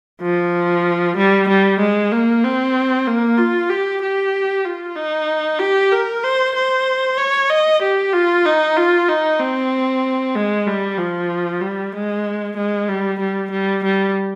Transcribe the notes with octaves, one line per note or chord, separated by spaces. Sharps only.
F3
G3
G3
G#3
A#3
C4
A#3
F4
G4
G4
F4
D#4
G4
A#4
C5
C5
C#5
D#5
G4
F4
D#4
F4
D#4
C4
G#3
G3
F3
G3
G#3
G#3
G3
G3
G3
G3